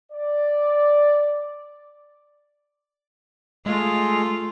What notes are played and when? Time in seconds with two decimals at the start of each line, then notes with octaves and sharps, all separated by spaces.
0.12 D5
3.66 G#3 A3 F4